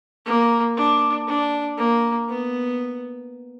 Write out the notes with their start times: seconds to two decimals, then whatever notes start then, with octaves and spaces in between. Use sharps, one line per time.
0.26 A#3
0.77 D4
1.27 D4
1.78 A#3
2.29 B3